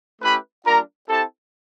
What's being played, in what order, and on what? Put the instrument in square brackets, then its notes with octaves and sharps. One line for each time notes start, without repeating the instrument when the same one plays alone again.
[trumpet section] A3 C#4 E4 G4 B4 B5
G3 A#3 D4 F4 A#4 A#5
C4 E4 G4 A4 A5